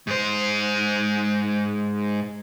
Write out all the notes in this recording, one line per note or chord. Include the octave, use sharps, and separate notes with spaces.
G#2 C5